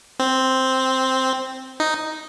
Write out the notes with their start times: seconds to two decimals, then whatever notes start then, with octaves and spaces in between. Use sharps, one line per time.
0.20 C4
1.80 D#4